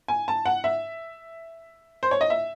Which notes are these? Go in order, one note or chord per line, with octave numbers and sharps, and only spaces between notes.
G#5
A5
F#5
E5
C5
C#5
D#5
E5